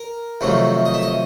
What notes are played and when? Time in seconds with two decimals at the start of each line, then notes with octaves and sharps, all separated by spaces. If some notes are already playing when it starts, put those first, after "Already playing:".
Already playing: A#4
0.41 F2 C3 D#3 F#3 A3
0.85 D#5
0.94 E5
1.02 D#5